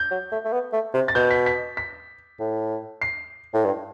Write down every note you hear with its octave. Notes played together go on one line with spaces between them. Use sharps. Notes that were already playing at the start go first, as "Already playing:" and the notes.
Already playing: G6
F#3
A3
A3
B3
A3
C3
A6
B2 G6
B6
B6
B6
A2
C7
A2
G2